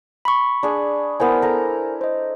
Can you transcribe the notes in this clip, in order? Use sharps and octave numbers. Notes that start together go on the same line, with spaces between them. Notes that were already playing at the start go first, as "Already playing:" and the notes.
B5 C#6
D4 G#4
B3 E4 A#4 C5 G#5
A4 A#5
C5 D#5